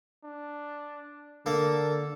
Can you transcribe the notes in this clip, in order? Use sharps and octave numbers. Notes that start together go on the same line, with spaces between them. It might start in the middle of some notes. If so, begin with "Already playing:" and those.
D4
D3 A#3 A4